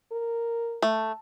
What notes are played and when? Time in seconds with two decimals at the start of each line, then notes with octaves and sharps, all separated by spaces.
0.12 A#4
0.82 A3